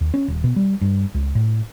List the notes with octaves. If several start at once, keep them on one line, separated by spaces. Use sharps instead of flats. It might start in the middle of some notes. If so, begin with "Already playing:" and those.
D#2
C#4
D#1
B2
G3
G2
C#2
A2